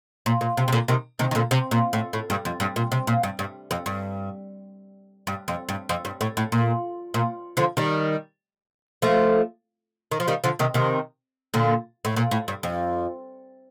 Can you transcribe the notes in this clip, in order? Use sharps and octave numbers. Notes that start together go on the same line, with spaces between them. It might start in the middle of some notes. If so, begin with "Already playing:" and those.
A#2
A#2
C3
C3
A#2 D3
C3 D#3
C3 D#3
D#3
A#2 D3
C3
A#2
A2
A2
G2
F2
G2
A#2
C3
A#2
G2
G2
F2
G2
G2
F2
G2
F2
G2
A2
A2
A#2
A#2
D3 F3
D#3 G3
F3 A3
D#3
F3
D#3 G3
D3 F3
C3 D#3
C3 D#3
A#2 D3
A2
A#2
A2
G2
F2